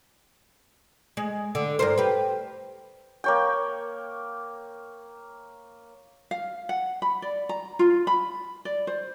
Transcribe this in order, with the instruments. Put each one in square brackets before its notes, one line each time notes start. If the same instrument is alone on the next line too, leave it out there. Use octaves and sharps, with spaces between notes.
[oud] G#3
D3
G2 A#4 C5
G4 B4
[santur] A#3 C#5 G5
[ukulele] F5
F#5
B5
D5
A#5
F4
B5
D5
C5